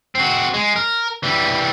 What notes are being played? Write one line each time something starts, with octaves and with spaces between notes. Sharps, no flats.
C4 F#4
G#3
A#4
E3 G3